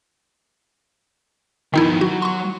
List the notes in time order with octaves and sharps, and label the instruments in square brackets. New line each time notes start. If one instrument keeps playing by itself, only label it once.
[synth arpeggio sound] D#3 D#4 E4 [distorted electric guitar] F3 B3
[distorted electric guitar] F#3 [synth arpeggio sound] F#4
[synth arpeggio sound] C6 C#6